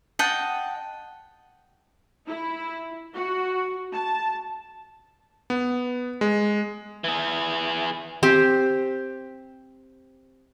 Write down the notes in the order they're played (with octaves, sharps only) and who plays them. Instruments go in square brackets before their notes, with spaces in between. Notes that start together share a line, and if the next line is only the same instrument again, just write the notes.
[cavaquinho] D#5 F#5 G5 A5
[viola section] E4
F#4
A5
[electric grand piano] B3
G#3
[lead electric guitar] E3 G#4
[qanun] C4 G4 C5